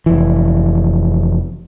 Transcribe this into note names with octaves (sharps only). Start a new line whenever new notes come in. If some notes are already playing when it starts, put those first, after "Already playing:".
F1 E3